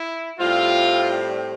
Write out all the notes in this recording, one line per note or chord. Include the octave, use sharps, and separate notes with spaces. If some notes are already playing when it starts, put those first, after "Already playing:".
Already playing: E4
A2 G3 C4 F4